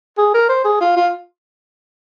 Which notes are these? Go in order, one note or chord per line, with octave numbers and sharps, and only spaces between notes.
G#4
A#4
C5
G#4
F4
F4